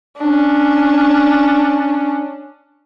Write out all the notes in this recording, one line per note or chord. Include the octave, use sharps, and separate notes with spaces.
C#4 D4